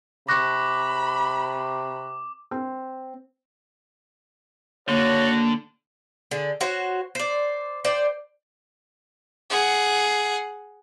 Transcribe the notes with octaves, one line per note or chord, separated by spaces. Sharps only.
C3 B5 C#6 D6 F#6 A#6
C4
D3 A#3 F#4 C#5
D3 G#4
F#4 C5 C#5
C5 D5
C5 D5 G5
G#4 F#5